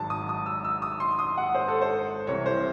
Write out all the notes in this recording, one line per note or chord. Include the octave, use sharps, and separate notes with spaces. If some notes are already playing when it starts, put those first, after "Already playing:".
Already playing: G#1 G#2 F#3 A5
D#6
D#6
E6
E6
D#6
C6
D#6
F#5
C5
A4
C5
C2 C3 E3 C#5
C5